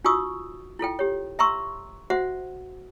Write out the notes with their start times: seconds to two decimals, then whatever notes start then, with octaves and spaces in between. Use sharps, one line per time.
0.04 D#4 F4 F#4 C#6 D#6 E6
0.79 E4 F4 A4 G5
0.99 G4 C#5
1.39 E5 A#5 C6 C#6 E6
2.10 F#4 C5 E5 F#5